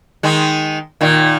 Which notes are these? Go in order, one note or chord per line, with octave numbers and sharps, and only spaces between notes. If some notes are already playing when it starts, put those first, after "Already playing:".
D#3 G#3
A#2 D#3